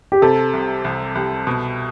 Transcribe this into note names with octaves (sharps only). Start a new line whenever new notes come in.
G4
C3 A4
C2
C2
C2
B2